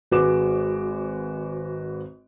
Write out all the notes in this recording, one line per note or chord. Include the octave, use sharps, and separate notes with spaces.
G#1 G#3 F#4 B4 D6 E7